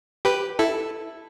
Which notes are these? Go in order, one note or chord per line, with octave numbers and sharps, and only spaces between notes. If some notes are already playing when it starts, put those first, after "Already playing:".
G4 B4
E4 A4